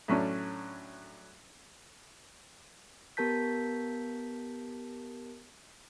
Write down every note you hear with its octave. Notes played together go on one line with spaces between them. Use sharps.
A2 F#3 C#4 D4
B3 G4 A#4 A5 G6 B6